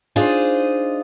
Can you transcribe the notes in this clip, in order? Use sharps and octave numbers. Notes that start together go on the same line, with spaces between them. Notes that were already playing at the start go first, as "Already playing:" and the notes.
D4 D#4 F4 G#4 C5 D#5